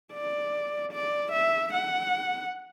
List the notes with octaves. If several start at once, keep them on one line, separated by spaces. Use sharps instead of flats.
D5
D5
E5
F#5